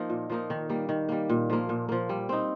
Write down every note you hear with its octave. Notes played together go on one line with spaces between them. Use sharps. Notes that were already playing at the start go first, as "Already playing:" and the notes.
Already playing: F3 A#3 D#4
A#2
F3 A#3 D#4
D#3
G3 A#3
D#3
G3 A#3
A#2
F3 A#3
A#2
F3 A#3
G3
C4 D#4